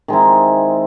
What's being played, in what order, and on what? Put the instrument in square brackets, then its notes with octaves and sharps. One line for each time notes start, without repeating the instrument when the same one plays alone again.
[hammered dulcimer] D#3 G#3 C4 E4